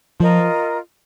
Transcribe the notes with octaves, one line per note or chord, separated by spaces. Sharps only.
F3 F4 A#4 D#5